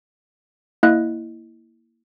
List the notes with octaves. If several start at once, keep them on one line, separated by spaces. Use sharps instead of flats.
A#3 E4 D#5 F#6